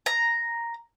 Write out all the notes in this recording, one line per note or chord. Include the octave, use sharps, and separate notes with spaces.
A#5